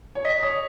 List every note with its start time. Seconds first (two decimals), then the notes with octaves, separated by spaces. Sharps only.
0.15 C#5
0.25 D#5 B6
0.43 C#5 D#6